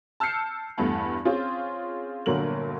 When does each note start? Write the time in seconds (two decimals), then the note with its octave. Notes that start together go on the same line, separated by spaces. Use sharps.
0.20 A5 E6 F6 G6 C7 C#7
0.78 E2 G2 A3 B3 A5
1.25 C4 C#4 F4 G#4
2.26 G1 A#2 D3 F#3 A#4 F#7